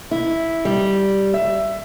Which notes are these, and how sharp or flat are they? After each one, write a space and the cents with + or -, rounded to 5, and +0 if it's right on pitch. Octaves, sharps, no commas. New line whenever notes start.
E4 -5
G3 -5
E5 +15